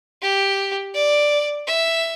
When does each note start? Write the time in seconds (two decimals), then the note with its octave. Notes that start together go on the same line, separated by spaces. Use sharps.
0.22 G4
0.95 D5
1.67 E5